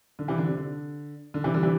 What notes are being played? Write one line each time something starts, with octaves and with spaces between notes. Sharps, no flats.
D3
C3 E3
D3
C3
D3
D3
C3 E3
D3 G3
C3 E3